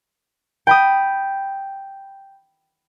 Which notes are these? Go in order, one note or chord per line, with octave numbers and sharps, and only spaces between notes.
G5 B5 D#6